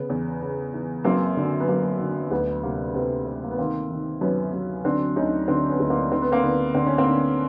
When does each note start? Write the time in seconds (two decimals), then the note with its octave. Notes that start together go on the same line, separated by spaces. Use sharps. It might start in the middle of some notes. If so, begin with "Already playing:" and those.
Already playing: C#3 B3
0.10 E2
0.41 C#3
0.74 E3
1.04 F#2 A#3 C4
1.37 D3
1.60 B3
1.68 F#2 A#3
2.00 D3
2.31 D2 B3
2.63 C3 A#3
2.94 C3 B3
3.27 C3
3.44 A#3
3.51 B3
3.58 D#3 A#3 C4
3.90 D#3
4.21 F#2 B3 C#4
4.53 F#2
4.84 D3 C4 D4
5.16 D2 C#4 D#4
5.48 D3 C4 D4
5.70 B3 C#4
5.80 D2
5.90 A#3 C4
6.11 D3 C4
6.22 B3
6.32 A#3 C4
6.43 D3 B3
6.74 D3 C4
6.86 C#4
6.98 A#3 C4
7.06 D3